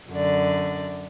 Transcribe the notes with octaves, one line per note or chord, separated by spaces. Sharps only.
F#2 D3 D5